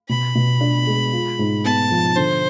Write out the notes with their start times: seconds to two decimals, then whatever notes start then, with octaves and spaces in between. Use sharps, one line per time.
0.09 B2 B5
0.35 B2
0.61 D4
0.87 G#3
1.13 F4
1.39 G#2
1.64 B3 A5
1.91 F3
2.16 D3 C5